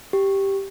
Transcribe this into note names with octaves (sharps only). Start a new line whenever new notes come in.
G4